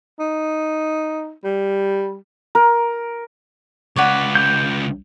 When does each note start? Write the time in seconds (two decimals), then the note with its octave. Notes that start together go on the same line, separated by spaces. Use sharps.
0.19 D#4
1.44 G3
2.55 A#4
3.96 C#2 B4 C#5 D5 F#5
4.35 G6